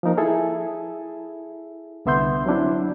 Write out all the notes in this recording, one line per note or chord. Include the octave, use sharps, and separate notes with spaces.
F3 A#3 D#4 A#4
E4 G#4 A4 E5
C2 D3 B3 E5 C6 G6
F#3 C4 D4 E4